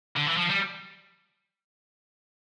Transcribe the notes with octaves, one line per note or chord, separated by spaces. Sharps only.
D3
E3
F3
G3